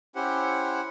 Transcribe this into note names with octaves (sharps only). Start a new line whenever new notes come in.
C#4 E4 G4 C5 F#5